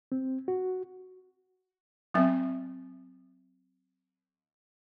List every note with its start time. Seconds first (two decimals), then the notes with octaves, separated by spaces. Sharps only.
0.12 C4
0.48 F#4
2.14 F#3 B3 C4 E5